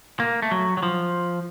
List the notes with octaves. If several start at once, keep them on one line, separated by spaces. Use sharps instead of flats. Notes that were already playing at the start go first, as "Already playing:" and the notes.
A#3
A3
F#3
F#3
F3